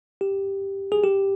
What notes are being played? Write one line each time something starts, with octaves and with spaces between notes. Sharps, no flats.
G4
G#4
G4